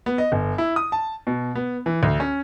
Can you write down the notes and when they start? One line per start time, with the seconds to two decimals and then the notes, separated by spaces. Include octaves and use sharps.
0.06 B3
0.18 D#5
0.32 G1
0.58 E4
0.76 D#6
0.92 A5
1.27 B2
1.55 B3
1.86 E3
2.03 D2
2.20 C#4